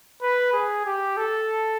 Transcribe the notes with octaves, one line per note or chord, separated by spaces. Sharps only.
B4
G#4
G4
A4